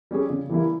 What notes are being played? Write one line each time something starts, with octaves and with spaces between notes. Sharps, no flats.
G3 C#4 G#4
C#3
E3 G3 A#3 E4